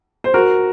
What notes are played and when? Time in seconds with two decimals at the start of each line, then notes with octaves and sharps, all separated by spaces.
0.24 C5
0.34 F#4 A#4